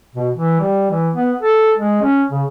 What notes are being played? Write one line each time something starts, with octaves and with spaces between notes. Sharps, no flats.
B2
E3
G3
E3
B3
A4
G#3
C#4
C#3